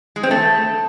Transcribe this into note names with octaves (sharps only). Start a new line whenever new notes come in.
G#3
C4
A3